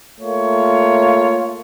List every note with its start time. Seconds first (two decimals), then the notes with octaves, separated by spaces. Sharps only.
0.21 A3 A#3 F4 C#5